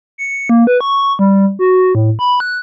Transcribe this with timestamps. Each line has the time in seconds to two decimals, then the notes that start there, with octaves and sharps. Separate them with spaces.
0.18 C#7
0.49 A#3
0.67 B4
0.81 C#6
1.19 G3
1.59 F#4
1.95 A2
2.19 B5
2.40 F#6